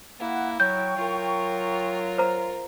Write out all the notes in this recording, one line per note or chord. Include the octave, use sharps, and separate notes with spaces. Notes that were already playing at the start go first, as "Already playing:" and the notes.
A#3 E4 F#5
F#3 G5 C#6 G6
F#3 F4 A#4
C5 A#5